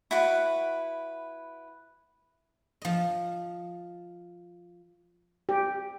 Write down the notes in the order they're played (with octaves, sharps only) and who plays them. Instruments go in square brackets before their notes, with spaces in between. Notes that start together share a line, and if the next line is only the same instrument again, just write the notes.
[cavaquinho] E4 F#4 B4
[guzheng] F3 D#5
[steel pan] G4